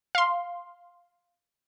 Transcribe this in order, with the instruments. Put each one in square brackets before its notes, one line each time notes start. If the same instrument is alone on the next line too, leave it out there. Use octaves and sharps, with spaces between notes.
[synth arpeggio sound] F5 C6